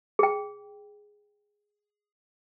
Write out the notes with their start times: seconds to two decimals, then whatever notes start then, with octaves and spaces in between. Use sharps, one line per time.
0.19 G#4 G5